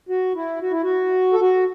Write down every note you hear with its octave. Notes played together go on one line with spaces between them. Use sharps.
F#4
E4
F#4
E4
F#4
A4
F#4